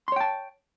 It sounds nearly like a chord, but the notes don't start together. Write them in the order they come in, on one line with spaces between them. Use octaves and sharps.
C6 C#5 G5 A5